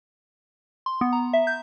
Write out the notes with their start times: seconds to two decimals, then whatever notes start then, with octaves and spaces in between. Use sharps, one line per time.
0.86 C6
1.01 B3
1.13 A#5
1.33 E5
1.47 G6